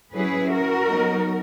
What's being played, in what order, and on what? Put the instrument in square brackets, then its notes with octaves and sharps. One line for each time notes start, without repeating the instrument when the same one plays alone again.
[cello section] F#3 C#4 E4 G#4 B4
F#4 A#4
F#3 B3 D#4